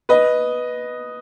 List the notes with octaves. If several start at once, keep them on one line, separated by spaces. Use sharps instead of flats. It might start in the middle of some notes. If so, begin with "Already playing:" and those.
B4 D#5